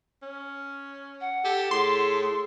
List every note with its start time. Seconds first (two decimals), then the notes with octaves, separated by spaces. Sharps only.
0.22 C#4
1.21 F#5
1.45 G4 A4
1.71 A2 G#4 C6